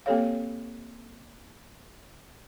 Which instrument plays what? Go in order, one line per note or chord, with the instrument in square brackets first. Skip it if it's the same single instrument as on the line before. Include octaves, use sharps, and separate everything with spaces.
[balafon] A#3 C4 G4 A4 C#5 F5